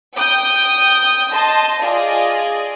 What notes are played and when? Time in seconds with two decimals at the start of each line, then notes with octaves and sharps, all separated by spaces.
0.15 G5 D#6 G6
1.32 D#5 A5 C6
1.82 F4 G#4 D5 D#5